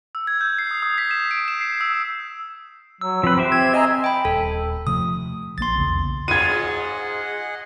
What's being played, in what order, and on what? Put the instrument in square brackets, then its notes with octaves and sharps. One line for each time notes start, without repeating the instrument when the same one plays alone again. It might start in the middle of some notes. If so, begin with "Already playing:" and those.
[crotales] E6
G#6
G6
C7
D#6
D#6
B6
E7
D7
E7
C7
E6
[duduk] F#3 [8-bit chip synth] E6
[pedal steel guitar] F3 B4 [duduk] C4
[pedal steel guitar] G4 C5 E5
[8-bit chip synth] G#6
[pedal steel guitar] G#4 [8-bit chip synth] D#5 G#5 A#5
[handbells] G5 B5
[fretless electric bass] D#1 [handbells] A4
[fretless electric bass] C3 F3 A3 [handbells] D#6
[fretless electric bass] A#1 A#3 [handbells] C6 A6
[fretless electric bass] B1 E2 C#3
[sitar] G#2 F#3 F4 [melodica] G#4 D#5 F#5 [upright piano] G#6 D#7